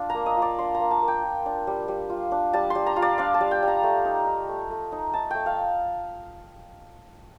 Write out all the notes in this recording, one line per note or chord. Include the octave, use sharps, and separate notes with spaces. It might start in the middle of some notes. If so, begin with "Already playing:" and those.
Already playing: D4 F4
A#3 A#5
D#5
F4
D5
D4 C6
A#5
A#3
A5
A#3
G5
F4
D4
G3
G3
F4
D4
G3 A5
G3 C6
A#5
F4
D5
D4 F5
A5
G3
G5
G3
A#5
A3
D#4
D#4
A3
A3
D#4
D#4 A5
A3 G5
F5